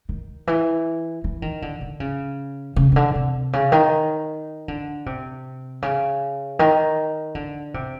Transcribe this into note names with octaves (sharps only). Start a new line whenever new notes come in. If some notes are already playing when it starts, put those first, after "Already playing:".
D#3
E3
E3
D#3
D3
D3
C#3
C#3
C#3
D3
C3
C#3
D#3
D3
C3
C#3
D#3
D3
C3